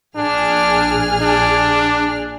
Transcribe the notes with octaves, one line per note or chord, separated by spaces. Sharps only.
A#1 D4 G#4 F6
D4